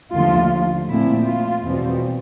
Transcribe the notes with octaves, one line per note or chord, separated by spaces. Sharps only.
D#2 D3 F3 A3 F4
A#2 F3 A3 C4 E4
F4
E2 B2 G3 C4